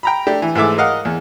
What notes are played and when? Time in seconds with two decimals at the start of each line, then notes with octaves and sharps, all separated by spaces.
0.03 G5 A#5 B5
0.27 A3 D4 G4
0.42 E3
0.55 G#2 E3 A3 E5 D6
0.78 A#4 D#5 F5 F#5
1.05 E2